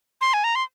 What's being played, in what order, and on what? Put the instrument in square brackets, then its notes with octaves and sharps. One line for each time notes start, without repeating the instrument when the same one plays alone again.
[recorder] C6
G#5
A#5
C6